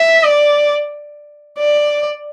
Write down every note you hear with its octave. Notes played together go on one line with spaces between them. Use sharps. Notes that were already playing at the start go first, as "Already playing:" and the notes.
Already playing: E5
D5
D5